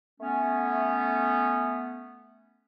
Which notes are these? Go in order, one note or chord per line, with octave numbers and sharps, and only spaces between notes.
A3 B3 C#4